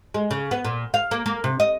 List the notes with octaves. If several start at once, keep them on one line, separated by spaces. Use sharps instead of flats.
G#3
C#3
B3
A#2
F5
A#3
A#3
C3
D#5